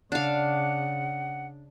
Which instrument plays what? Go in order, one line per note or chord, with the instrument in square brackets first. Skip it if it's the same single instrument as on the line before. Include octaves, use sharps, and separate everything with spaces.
[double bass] C#3 [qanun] D4 F5 [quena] F#5